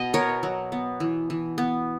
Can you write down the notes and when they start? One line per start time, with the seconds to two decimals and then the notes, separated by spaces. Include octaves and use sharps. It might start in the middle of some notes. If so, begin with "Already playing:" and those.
Already playing: B2 D#5
0.13 B3 A#4 C#5
0.43 F#3
0.72 B3
1.00 E3
1.30 E3
1.58 B3